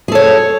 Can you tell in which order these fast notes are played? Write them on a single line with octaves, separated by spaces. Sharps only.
G#4 A4 C#5